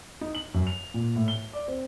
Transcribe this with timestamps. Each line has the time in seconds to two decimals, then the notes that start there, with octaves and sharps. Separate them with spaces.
0.21 D#4
0.35 F#7
0.54 F#2
0.67 F7
0.94 A#2
1.16 A2
1.28 G7
1.53 D5
1.68 C4